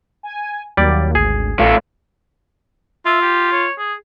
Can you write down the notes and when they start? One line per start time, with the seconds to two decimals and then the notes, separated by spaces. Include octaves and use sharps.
0.23 G#5
0.77 D#2 F#3 G3 A#3 D5
1.15 G#1 D2 G#4
1.59 A1 A3 F4
3.06 F4 E5
3.22 G4
3.52 C#5
3.78 G#4